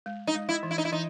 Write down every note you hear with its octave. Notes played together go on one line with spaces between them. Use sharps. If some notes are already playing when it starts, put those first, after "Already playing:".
G#3
D#4
G#3
E4
E3
E4
D#4
E4
E3 D#4